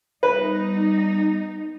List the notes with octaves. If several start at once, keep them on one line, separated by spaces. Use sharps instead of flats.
G3 B3 D#4 B4